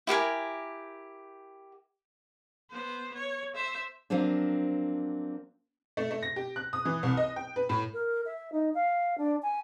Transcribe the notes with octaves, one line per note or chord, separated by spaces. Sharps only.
E4 G4 A#4 G#5
B3 C5
C#5
C5 E5
F3 F#3 A#3 C4 D4
A3
A3
A#6
G4
F#6
D#6
E3
C2
D#5
G5
B4
A2
A#4
E5
D#4
F5
D4
G#5